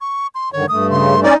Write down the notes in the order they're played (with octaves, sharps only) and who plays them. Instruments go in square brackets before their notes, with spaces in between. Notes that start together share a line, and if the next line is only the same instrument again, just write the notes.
[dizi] C#6
C6
[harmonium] G2 D3 D#3 [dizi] C#5
[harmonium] G2 A3 [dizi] D#6
[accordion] C#3 [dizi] C6
[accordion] C#4 D5 [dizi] D#4